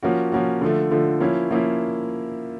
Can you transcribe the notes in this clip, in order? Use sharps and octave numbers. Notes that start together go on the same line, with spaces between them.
F3 A#3 C#4 F#4
F3 A#3 C#4 F#4
D3 F3 A3
D3 F3 A3
F3 A#3 C#4 E4
F3 A#3 C#4 E4